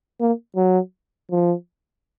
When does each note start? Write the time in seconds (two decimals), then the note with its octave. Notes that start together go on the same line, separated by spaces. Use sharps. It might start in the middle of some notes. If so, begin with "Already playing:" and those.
0.20 A#3
0.56 F#3
1.31 F3